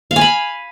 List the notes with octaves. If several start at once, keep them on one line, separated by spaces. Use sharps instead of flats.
F5
G#5
B5